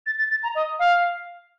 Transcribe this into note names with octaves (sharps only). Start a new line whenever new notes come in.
A6
A6
A6
A#5
D#5
F5